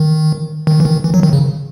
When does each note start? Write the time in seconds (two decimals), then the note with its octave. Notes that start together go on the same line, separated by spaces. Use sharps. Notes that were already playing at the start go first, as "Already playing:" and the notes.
Already playing: D#3
0.67 D#3
0.80 E3
0.85 D#3
1.04 E3
1.14 F#3
1.23 D#3
1.33 C#3